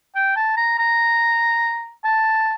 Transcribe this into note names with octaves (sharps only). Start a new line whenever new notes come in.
G5
A5
A#5
A#5
A5